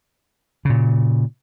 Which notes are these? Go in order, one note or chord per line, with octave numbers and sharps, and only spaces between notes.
A#2 C#3